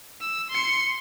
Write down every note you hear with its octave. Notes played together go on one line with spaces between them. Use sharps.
E6
C6 C#7